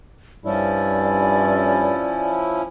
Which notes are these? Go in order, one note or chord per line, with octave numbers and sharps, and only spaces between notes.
G2 F3 C#4 E4 D5